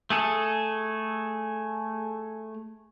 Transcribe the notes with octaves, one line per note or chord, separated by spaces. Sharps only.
A3 G#4 A4